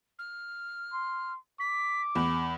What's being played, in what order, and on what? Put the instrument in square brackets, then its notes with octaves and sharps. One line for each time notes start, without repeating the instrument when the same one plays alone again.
[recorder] F6
[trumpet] C6
[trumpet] D6 [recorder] B6
[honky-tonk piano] E2 [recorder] B5